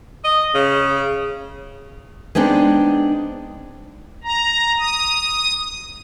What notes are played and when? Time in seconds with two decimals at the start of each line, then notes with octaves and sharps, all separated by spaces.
0.24 D#5
0.55 C#3
2.35 G#3 B3 C4 D4 D#4
4.24 A#5
4.79 D#6